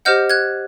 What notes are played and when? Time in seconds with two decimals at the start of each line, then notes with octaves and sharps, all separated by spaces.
0.05 G4 C5 D#5 F#5 F6 G6
0.30 F#6 G#6